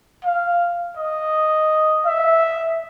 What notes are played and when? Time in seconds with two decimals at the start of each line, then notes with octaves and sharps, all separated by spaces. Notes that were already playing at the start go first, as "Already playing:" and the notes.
0.24 F5
0.97 D#5
2.06 E5